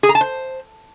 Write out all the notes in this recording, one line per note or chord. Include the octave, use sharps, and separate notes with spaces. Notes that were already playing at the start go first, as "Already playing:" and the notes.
G#4
A#5
A5
C5